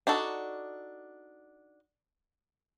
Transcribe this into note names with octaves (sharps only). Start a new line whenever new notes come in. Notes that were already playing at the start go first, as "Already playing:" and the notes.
D4 D#4 F#4 A4